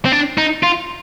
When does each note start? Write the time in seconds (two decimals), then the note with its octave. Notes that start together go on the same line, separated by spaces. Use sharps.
0.05 C4
0.12 D4
0.38 D#4
0.63 F4